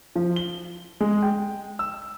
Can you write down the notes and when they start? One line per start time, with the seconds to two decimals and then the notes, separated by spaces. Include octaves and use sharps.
0.16 F3
0.36 G7
1.01 G#3
1.22 G5
1.79 E6